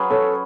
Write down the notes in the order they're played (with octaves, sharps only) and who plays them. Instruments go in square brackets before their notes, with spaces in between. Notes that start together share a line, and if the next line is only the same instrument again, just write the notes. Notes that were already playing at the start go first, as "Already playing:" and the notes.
Already playing: [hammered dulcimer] F#3 C#4 G#4 B4
[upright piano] A4 C#5